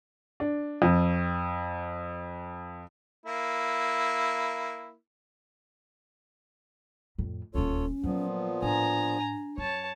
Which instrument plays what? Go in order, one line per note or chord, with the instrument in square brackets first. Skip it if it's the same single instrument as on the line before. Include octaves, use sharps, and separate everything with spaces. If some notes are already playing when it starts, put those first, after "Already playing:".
[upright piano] D4
F2
[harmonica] A#3 E4
[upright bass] F2 A2
[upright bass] D#1 D2 [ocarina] C#4 [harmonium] F4 A4 C#5
[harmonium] A#2 F3 B3 [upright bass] F#3 A#3
[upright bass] A2 [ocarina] D4 [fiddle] G#5 A#5
[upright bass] F#2 [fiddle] C#5 A5